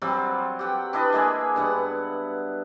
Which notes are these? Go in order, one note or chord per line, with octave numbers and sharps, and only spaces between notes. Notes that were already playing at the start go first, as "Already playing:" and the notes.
F#3 G3 C4 F4
G4 F#5 G5
D4 E4 B4 D#5
G#3 A#3 G#4 E5
G2 B3 F#5